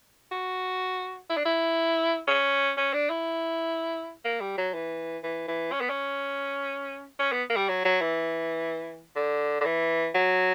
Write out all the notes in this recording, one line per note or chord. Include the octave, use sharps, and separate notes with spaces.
F#4
E4
D4
E4
C#4
C#4
D4
E4
A#3
G3
F#3
E3
E3
E3
C#4
B3
C#4
C#4
B3
A#3
G3
F#3
F#3
E3
D3
D3
E3
F#3